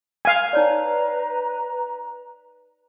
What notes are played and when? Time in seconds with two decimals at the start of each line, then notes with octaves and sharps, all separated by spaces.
0.25 F5 G#5
0.53 D#4 B4 C#5 D5 A#5